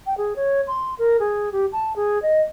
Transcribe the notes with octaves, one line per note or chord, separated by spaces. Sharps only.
G5
G#4
C#5
C6
A#4
G#4
G4
A5
G#4
D#5